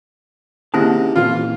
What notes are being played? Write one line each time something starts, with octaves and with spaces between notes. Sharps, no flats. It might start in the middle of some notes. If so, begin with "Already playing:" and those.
C3 D#3 A#3 C#4 E4 G#4 A5
F2 A#2 E3 F4